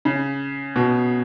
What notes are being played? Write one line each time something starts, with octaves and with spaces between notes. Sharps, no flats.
C#3
B2